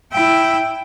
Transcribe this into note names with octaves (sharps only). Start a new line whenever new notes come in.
E4 G5